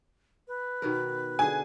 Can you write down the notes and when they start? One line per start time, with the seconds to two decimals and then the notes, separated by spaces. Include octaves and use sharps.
0.48 B4
0.82 B2 D#3 A#4
1.39 D3 G#4 G#5